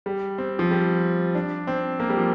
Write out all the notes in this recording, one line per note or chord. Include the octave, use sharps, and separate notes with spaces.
G3
C4
F3
G3
D4
C4
A#3
G3
F3